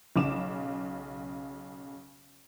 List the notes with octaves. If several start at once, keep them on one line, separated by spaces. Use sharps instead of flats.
B1 C#3 D6 E7